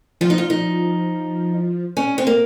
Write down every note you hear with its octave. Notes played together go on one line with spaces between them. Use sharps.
F3 F4
D#4
F4
D#4
C#4
C4
A#3